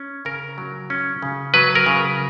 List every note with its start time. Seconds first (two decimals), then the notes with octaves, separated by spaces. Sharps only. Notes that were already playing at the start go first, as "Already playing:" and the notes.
Already playing: C#4
0.25 C#3 A#4
0.58 F#3
0.90 C#4
1.23 C#3
1.54 F#3 B4
1.75 A#4
1.86 C#3